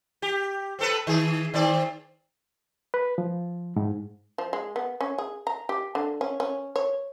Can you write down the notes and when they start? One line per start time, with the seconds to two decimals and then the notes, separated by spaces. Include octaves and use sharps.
0.22 G4
0.79 C4 A4 B4
1.07 D#3 G#4
1.54 D#3 C4 D5
2.94 B4
3.18 F3
3.76 G#2
4.38 F3
4.53 G#3
4.76 B3
5.01 C#4
5.18 G#4
5.47 A#5
5.69 G4
5.95 D3
6.21 C#4
6.40 C#4
6.76 C#5